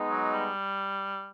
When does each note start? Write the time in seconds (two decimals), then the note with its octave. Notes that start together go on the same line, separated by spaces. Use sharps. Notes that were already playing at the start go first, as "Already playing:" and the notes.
Already playing: G#3 B3 D#4
0.09 F#3
0.33 G3